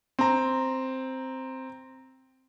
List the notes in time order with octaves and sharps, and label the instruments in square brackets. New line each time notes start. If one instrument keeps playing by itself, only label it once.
[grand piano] C4 A#5